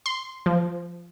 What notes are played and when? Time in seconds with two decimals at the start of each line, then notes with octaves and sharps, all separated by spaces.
0.06 C6
0.46 F3